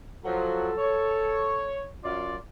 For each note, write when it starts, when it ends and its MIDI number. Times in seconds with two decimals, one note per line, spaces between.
0.24 0.70 53
0.24 0.70 54
0.24 1.76 69
0.78 1.85 73
2.03 2.35 42
2.03 2.35 65
2.03 2.35 74